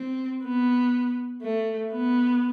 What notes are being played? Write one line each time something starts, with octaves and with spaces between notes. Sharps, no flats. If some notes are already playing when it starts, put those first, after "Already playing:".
Already playing: C4
B3
A3
B3